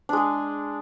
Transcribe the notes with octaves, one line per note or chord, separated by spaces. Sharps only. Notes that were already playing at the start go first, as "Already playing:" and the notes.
G#3 D4 G#4